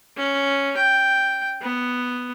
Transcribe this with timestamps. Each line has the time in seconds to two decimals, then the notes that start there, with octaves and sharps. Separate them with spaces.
0.17 C#4
0.77 G5
1.61 B3